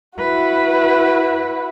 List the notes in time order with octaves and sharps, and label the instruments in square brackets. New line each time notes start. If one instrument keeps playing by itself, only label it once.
[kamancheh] E4 F#4 [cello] B4